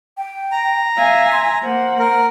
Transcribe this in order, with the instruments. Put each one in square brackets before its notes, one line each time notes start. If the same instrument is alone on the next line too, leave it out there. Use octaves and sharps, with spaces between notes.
[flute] G5
[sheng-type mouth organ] A#5
[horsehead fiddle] E5 G#5 [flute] F5
[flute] C6
[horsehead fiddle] A#3 F#5 [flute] C5
[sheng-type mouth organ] A#4